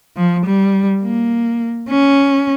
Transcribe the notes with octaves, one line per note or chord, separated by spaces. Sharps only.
F3
G3
A#3
C#4